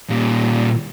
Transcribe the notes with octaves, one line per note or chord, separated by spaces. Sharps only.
A#2 G3